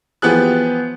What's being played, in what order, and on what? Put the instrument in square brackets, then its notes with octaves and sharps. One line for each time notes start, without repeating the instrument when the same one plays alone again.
[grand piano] E3 F3 B3 G4 G#4 F#6